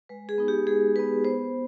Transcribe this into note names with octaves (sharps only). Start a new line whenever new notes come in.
G#3 B4
G#4
B3 D#4
G4
G#3 G#4
B3 D#4 B4
B3 C5